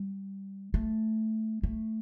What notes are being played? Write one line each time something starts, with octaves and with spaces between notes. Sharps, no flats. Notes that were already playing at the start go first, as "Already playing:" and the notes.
Already playing: G3
A3
A3